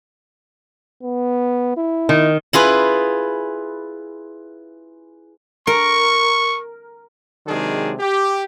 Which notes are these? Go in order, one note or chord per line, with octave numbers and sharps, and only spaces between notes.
B3
E4
D#3
E4 F4 G#4 B4
A#4 C#6
C3 D#3 F#3 G#3 D4 G#4
G4